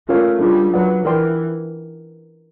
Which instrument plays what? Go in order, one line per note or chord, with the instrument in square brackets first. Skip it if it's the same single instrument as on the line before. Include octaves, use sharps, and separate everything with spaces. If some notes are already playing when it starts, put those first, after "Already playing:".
[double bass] A3 [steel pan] C#4 F4 A#4 C#5 F5
[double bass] G3 [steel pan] D4 F4 G#4
[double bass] F#3 [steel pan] B4 D5 F#5
[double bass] E3 [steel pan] A#4 D5 G5 C6